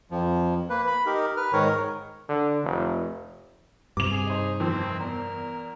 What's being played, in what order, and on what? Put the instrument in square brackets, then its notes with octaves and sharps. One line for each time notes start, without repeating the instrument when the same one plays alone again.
[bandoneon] F2 F3
A#3 B4
B5
D#4 G4 A#4
B4 F6
G#2 D#3 A#4 C#5
[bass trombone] D3
F1
[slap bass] G2 C3 [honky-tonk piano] D6 F7
[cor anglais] G#4
[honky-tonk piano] D#4 C5
[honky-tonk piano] F2 D#3 E3 [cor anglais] C4
[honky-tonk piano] E2 [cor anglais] A#4